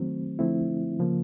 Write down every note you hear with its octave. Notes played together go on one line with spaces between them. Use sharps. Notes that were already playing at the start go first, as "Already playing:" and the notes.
Already playing: D#3 F#3 A3 C4
D3 F3 A3 C4 E4
C#3 F3 A#3